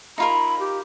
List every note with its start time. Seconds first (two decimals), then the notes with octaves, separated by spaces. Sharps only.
0.18 D#4 F4 A#4 B5
0.60 G4